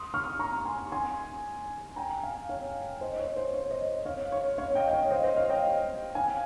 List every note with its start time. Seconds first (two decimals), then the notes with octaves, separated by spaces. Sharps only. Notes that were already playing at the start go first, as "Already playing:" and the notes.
Already playing: C6 D#6
0.14 C#6 F6
0.39 A#5 C#6
0.65 G#5 C6
0.92 G#5 C6
1.96 G5 A#5
2.23 F5 G#5
2.49 C#5 F5
3.01 C5 D#5
3.19 C#5
3.37 C5
3.54 C#5
3.71 C5 D#5
4.06 C#5 F5
4.32 C#5
4.58 C#5 F5
4.75 D#5 G5
4.88 G5
4.93 C#5 F5
5.10 C5 D#5
5.24 C5 D#5
5.37 C#5 F5
5.50 D#5 G5
6.15 F5 G#5